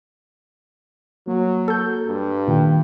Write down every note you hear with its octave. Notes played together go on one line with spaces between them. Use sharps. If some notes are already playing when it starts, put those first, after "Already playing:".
F#3 A#3
A4 G6
G2
A#2 D#3 G5